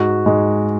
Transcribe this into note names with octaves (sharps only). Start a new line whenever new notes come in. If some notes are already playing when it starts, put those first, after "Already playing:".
Already playing: G#2 F#4
G#2 G#3 G#4